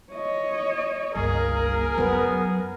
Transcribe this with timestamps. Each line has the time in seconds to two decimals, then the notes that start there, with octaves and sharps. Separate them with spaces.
0.13 C#5 D#5
1.15 G1 C#2 A#3 G#4 A#4
1.97 F#2 F#3 B3